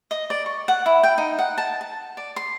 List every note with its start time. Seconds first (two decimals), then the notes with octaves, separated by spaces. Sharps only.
0.11 D#5
0.30 D5
0.46 C#6
0.68 F#5
0.86 E4
1.03 G5
1.18 D#4
1.39 F#5
1.58 A5
1.81 A5
2.17 D5
2.36 C6